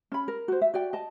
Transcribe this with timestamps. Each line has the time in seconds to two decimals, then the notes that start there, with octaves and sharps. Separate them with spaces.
0.12 C#4 B5
0.28 A#4
0.48 F#4 C5
0.62 E5
0.74 F#4 D5 G5
0.93 D#5 A5